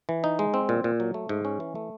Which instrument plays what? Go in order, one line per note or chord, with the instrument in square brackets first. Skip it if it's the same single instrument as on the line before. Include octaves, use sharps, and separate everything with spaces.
[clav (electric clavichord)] E3
D#4
G#3
C4
A#2
A#2
F#3
A3
G#2
C#4
E3
A3